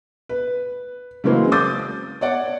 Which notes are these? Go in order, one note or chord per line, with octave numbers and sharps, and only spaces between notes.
B4
C#3 E3 F#3 G#3 A#3 C4
D6 D#6 G6 A6
C#5 D5 F#5